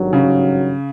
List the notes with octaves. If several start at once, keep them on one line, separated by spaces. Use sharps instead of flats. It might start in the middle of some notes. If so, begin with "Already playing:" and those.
Already playing: G#1 G2 D#3 F#3
C#3